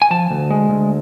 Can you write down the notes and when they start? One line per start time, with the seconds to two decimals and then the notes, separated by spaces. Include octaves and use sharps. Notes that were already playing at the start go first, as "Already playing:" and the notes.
0.02 G#5
0.11 F3 A5
0.31 D2
0.51 G#3
0.70 D2